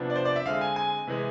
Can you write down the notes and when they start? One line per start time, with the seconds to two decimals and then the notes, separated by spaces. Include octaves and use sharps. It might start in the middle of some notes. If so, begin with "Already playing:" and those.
Already playing: C3 F3 B3 D4
0.10 D5
0.16 C5
0.25 D5
0.36 E5
0.46 D3 G#3 C4 F5
0.61 G#5
0.76 G#5
1.07 C3 E3 G#3